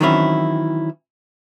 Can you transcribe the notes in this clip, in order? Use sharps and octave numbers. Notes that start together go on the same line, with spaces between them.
D#3 E3 F#3 C4 C#4 E4